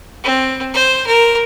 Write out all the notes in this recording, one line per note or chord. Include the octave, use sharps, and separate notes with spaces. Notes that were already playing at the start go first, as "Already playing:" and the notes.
C4
C5
A#4